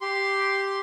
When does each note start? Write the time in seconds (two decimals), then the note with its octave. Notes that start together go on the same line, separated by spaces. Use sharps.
0.01 G4 C6